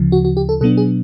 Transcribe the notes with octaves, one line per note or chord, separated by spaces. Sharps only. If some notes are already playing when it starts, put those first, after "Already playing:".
Already playing: D2 C#3 F3
F#4
F#4
G4
A4
B2 F#3 B3 D4 A4
G#4